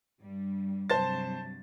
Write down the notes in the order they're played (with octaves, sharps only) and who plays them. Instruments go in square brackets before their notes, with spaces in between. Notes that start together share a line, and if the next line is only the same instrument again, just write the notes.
[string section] G2 G3
[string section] G2 C3 F#3 [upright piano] C5 A5 A6